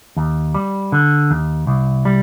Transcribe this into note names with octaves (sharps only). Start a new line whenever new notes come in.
D#2
G3
D3
D#2
C2
G3